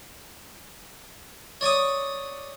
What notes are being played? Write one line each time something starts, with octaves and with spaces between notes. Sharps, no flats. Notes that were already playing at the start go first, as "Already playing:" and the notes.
C#5 D5 C#6 D#6